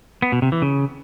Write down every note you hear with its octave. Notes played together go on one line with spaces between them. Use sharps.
B3
B2
C3
E3
C#3